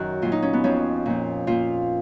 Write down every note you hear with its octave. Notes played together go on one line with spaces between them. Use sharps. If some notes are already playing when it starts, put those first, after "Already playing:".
Already playing: F#2 D#3 D#4 F#4
A#2 F#3 F4
D#4
C#4
B3
F2 F3 C#4
A#2 F3
A#2 F3 F4